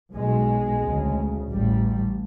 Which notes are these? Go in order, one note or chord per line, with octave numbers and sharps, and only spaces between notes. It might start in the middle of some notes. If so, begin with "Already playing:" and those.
B1 B2 G#3
D2 C#3
A1 A2 G3